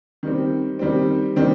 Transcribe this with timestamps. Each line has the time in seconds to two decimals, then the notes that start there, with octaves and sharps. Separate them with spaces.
0.23 D#3 G3 C4
0.79 D#3 G3 C4
1.36 D#3 G3 C4